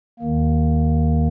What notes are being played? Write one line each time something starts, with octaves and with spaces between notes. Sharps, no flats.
D#2 D#3 A#3